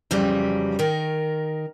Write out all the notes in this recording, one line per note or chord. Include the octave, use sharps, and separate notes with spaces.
F2 C#3 E3 F#3 G3
D#3 A#4